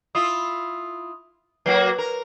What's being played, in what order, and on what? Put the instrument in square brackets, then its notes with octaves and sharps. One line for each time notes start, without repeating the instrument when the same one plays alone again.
[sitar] E4 F4 [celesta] D#6
[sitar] F#3 A#3 F#4 [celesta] B4
[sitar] A#4